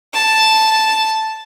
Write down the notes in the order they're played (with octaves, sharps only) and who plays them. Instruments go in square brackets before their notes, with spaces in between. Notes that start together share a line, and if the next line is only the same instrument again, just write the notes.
[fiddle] A5